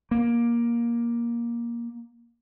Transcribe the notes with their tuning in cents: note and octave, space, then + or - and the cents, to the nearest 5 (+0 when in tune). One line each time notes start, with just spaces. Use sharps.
A#3 +15